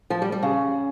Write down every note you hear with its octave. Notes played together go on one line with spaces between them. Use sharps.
F3
G3
G3
C#3